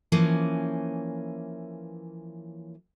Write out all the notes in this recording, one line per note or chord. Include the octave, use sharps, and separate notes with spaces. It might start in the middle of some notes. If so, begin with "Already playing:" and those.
E3 F3 A#3 C#4